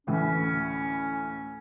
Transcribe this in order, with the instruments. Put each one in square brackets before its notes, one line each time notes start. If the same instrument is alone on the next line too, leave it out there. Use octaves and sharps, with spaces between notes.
[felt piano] D2 A2 E3 [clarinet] C#4